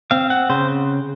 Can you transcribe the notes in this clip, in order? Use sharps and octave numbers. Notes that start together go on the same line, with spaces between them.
C4 F5
F#5
C#3 C5